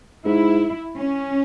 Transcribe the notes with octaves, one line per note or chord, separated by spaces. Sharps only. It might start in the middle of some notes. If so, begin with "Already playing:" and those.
G#2 E4
C#4